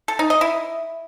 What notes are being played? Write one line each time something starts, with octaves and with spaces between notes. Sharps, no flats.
A4
D#4
D#5
E4